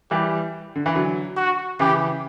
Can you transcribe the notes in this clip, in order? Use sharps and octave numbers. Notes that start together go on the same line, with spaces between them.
E3 G3 G4
D3
E3
D3 F#3
F#4
C#3 E3 G4